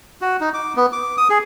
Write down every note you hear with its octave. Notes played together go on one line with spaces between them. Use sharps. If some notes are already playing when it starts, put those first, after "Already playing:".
F#4
D#4
D6
B3
D6
D#6
G#4